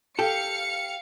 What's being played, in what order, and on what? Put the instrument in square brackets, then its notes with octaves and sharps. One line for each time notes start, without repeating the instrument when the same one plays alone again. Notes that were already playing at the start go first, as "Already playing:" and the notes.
[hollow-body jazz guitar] G4 A4 [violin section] F5 C#7